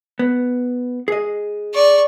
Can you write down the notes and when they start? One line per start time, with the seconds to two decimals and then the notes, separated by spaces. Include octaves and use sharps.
0.19 B3
1.08 G#4 D#5
1.74 D5 C#6